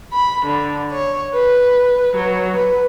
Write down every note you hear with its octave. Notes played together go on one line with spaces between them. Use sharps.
B5
D3
C#5
B4
F#3
B4